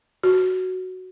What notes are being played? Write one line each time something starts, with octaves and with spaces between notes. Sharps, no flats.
F#4